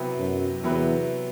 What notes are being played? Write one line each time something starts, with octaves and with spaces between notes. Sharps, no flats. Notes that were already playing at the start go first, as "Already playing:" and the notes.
Already playing: C3 F#3 B3 E4 B4
F#2
E2 C3 F#3 B3 E4 B4